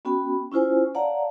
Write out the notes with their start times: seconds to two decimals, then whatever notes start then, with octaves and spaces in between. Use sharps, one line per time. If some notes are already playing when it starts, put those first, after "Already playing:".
0.05 B3 C#4 F#4 G5 B5
0.52 C#4 E4 F4 C5 G#5
0.95 C#5 D5 F5 F#5 A5 A#5